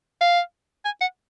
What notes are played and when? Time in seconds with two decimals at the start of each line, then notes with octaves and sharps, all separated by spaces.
0.21 F5
0.85 G#5
1.01 F#5